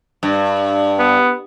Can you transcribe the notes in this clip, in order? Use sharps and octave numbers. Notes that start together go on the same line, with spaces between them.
G2
B3